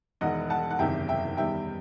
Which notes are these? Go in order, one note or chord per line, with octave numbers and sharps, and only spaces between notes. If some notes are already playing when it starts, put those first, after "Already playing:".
E1 E2 D#3 D#5 F#5
F#5 A5
F#5
F#1 E2 C3 D#3 E5 G5
E5 G5
E2 D#3 G3 E5 G5